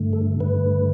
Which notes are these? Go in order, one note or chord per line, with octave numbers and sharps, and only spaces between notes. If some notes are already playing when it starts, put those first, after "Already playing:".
Already playing: G2 D3 A3
A4
G2 D3 A3 B4